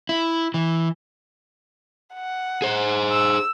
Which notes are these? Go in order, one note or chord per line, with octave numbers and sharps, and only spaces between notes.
E4
E3
F#5
G#4 C5
E6